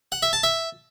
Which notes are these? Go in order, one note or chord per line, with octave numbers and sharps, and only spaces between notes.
F#5
E5
A5
E5